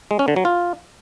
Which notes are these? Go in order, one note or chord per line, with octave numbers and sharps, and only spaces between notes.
G#3
C#4
D3
F#3
F4